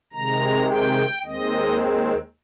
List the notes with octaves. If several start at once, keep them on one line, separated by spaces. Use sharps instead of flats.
C3 D#3 G#3 A#5
G5
D#2 D#3 G#3 C4 D#5